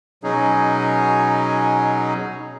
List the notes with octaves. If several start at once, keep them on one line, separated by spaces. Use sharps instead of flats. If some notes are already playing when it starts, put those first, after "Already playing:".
B2 F#3 C#4 D#4 G#4